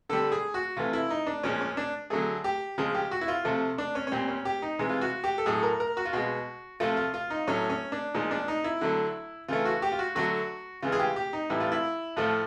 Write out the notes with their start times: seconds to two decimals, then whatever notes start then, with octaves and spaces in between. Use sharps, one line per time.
0.09 D3 G3 A4
0.32 G#4
0.54 F#4
0.77 C3 E3 A3 F4
0.93 E4
1.10 D#4
1.27 D4
1.43 A#2 F3 G#3 C#4
1.61 C#4
1.77 D4
2.10 D3 F#3 A3 G#4
2.44 G4
2.78 C#3 F3 G#3 G#4
2.95 G4
3.11 F#4
3.21 E4
3.28 F4
3.45 C3 F3 A3
3.78 D4
3.95 C#4
4.07 C#4
4.12 A#2 G3 C4
4.28 C#4
4.45 G4
4.62 D#4
4.79 C3 E3 G#3
4.89 F4
5.01 F#4
5.24 G4
5.38 A4
5.46 A2 F#3 A3 G#4
5.63 A#4
5.80 A#4
5.97 F#4
6.05 F4
6.13 B2 G#3 F#4
6.80 C3 F3 A3 F4
6.97 F4
7.14 F4
7.30 D#4
7.47 A2 F#3 A3 C#4
7.70 C#4
7.92 D4
8.14 A#2 F3 G#3 D#4
8.31 D4
8.48 D#4
8.64 E4
8.81 D3 F#3 A3
9.48 C#3 E3 A3 F4
9.65 F#4
9.82 G4
9.92 F4
9.99 F#4
10.15 D3 F#3 A3 F#4
10.82 C#3 E3 G#3 F4
10.92 G#4
10.99 G4
11.16 G4
11.33 D#4
11.50 A2 E3 G3 E4
11.60 F4
11.72 E4
12.17 A2 F3 A3 F4